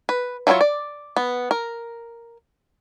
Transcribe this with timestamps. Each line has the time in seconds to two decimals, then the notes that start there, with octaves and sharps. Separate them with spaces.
0.09 B4
0.47 F#3 A3 E4 F4 C#5
0.61 D5
1.17 B3
1.51 A#4